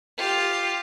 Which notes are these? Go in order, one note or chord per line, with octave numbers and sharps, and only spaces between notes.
F4 G4